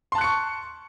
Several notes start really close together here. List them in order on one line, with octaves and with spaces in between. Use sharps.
C6 A5 F#6 C#7 C#6